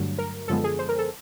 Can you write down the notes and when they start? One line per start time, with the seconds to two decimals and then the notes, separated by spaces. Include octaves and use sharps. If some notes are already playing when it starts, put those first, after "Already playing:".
Already playing: G2 D3 F#3 A3
0.18 A#4
0.48 F#2 D3 F3 G#3 B3 A4
0.64 G#4
0.79 C5
0.89 A#4
0.98 A4